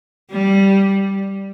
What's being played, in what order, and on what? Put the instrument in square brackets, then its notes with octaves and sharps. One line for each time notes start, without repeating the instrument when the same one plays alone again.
[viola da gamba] G3